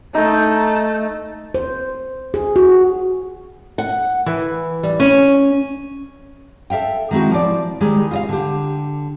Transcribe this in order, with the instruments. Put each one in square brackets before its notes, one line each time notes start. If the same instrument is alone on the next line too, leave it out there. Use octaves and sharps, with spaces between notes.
[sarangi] A3 [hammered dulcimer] D#4
[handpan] C5
G#4
F#4
[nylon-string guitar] F#5
E3
G3
C#4
A4 E5 F5 G5
D#3 G#3 C4 E4 F#4
F3 D5
D#3 G3 G#3 G#4
F4 D#5 F5
D3 G4